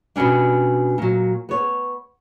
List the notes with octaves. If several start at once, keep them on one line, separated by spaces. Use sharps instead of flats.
B2 G3 A#3 C#4 D4
A#2 F#3
B3 C#5